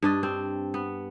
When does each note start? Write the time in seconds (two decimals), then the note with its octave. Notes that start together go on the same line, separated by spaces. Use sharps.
0.02 G2 D4 D#5
0.23 C4
0.74 B3